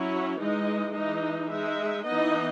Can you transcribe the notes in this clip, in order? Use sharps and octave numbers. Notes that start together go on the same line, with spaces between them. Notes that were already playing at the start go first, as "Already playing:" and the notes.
Already playing: F#3 C#4 E4 C#5
E3 G#3 D#4 D#5
E3 G#3 D#4 D#5
G#3 D#4 E5
E3 B3 D#4 D#5